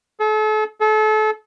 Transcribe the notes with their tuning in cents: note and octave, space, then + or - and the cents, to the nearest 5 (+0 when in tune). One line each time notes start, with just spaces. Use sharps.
A4 -40
A4 -35